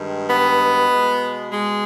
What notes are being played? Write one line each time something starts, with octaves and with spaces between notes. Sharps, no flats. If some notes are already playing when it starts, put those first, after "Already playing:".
Already playing: G2 D#3 G#3
B3
B2 G#3
G#3